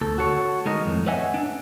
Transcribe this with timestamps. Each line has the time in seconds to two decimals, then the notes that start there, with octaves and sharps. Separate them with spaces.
0.01 D2 A4
0.18 F#4 A4 C#5
0.65 D#3 G#3 A#4 D#5
0.85 F2 A2
1.06 B4 C#5 D#5 E5 F#5 G#5
1.34 D4